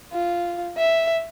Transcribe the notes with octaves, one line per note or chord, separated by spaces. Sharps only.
F4
E5